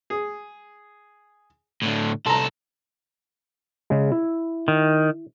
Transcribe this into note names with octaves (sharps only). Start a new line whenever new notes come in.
G#4
A2 D3
C2 A4 A#5 C6
C#3 G#3
E4
D#3